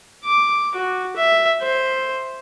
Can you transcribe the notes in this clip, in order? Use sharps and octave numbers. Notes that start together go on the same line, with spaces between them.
D6
F#4
E5
C5